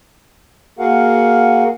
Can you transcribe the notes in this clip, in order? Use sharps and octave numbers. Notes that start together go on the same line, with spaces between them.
A#3 F#4 G#4 A#4 F5 F#5